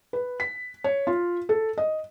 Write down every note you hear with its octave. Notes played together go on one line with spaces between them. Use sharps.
B4
B6
C#5
F4
A4
D#5